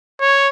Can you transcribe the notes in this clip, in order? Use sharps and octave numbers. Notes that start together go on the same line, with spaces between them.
C#5